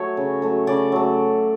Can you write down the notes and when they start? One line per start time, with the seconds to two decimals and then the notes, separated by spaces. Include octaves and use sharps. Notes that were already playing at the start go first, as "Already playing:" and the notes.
Already playing: F#3 A3 C#5
0.17 C#3
0.42 F#3 A3
0.67 C#3 D5
0.92 F#3 A3